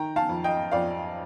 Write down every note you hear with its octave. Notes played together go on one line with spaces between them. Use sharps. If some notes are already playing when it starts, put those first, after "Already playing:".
Already playing: D#3 G5 A#5
F5 A5
F2
D#5 G5
F2 D5 F5